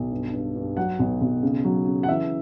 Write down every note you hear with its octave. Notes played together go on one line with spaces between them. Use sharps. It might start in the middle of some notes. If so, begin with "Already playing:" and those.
Already playing: B1
G2
G2
G2
F#3 F#5
B1
B1
C#3
F#3
C#3
F#5
E3 E5